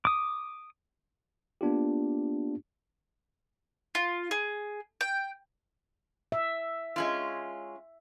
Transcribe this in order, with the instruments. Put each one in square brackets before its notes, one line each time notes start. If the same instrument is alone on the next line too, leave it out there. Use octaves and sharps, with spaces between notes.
[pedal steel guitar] D6 D#6
[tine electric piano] A#3 B3 D4 F4 G4
[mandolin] F4
G#4
G5
[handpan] E5
[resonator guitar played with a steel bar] G#3 C#4 F4